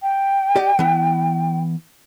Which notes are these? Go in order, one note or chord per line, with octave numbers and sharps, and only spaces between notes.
G5
G4 D5 D#5
E3 B3